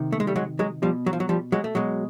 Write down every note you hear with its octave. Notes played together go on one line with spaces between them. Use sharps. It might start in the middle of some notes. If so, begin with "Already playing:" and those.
Already playing: C3 D#3
A3
G#3
G3 A3
F#3 G#3
F#3 G#3
B2 F3 G3
F#3
F3
F#3
F3 G3
F#3 G#3
A3
B2 F#3 G#3